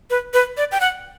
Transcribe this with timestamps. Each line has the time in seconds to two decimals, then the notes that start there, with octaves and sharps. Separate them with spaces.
0.10 B4
0.34 B4
0.57 D5
0.72 G5
0.80 F#5